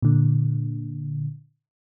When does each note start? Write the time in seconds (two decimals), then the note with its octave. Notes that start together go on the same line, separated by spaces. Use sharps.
0.02 A#2 D3